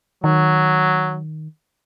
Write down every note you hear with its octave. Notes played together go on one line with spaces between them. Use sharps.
D#3 F#3